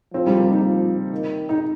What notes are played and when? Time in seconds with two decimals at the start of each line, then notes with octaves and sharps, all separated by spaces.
0.14 F3 C4
0.27 G3
0.38 A#3
0.51 D#4
0.63 F3
1.12 D#3
1.49 D#4